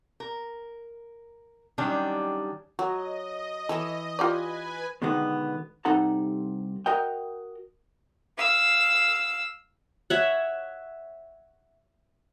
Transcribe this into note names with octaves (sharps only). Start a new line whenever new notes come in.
A#4
D#3 F#3 G3 C#4 D4 G4
F#3 F#4 D#5
E3 A4 C#5 E5
F4 G4 B4 D5 G#5
B2 D3 D#3 G#3 B3
C2 C3 D#4 A4 F#5 A#5
F#4 A#4 D#5 G5
F5 E6
C#5 E5 F#5